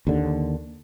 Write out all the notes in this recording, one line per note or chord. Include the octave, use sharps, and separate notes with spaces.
D#2 D3